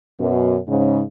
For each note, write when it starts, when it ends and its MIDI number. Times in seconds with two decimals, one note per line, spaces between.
0.19 0.58 42
0.19 0.58 47
0.68 1.03 44
0.68 1.03 49